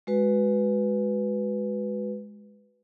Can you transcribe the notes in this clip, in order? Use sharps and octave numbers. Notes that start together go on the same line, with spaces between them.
G#3 F#4 B4